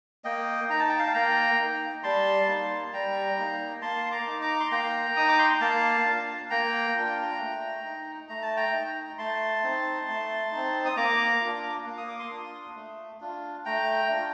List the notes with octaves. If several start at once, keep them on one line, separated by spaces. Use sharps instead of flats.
A#3 D#5 G5
D#4 A#5
A5
G5
F5 A5
A#3 G5 A#5
D#4
G3 A5 C6
A#3 D#4
G3 G5 A#5
A#3 D#4
A#3 A5 C6
A#5 D6
D#4
A#5 D6
C6
A#3 G5 A#5
D#4 D#6
D6
C6
A#5
A#3 F5 A5
D4 F4
A#3 G5 A#5
D4 F4
A3
D#4
A3 A#5
A5
G5 A#5
D#4
A3 A5 C6
C4 D#4
A3
C4 D#4
D#6
A#3 A#5 D6
D4 F4
A#3
D#6
D6
C6 D#6
D4 F4
A3
D4 F4
A3 G5 A#5
D4 F4